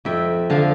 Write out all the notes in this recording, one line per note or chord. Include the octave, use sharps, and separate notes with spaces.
F2 E5 G5
D3 F3 F5 A5